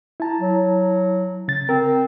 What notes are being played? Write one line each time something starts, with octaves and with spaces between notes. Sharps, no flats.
E4 A5 A#5
F#3
C#3 A6
C4 A#4